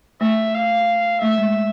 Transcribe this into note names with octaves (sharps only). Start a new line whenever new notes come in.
A3 E5
F5
A3 E5
G#3